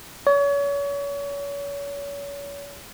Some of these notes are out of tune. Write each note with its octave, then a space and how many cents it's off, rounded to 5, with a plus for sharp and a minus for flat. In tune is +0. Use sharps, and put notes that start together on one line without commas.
C#5 +35